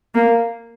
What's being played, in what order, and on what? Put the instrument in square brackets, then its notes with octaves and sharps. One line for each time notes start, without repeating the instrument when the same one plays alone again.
[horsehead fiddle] A#3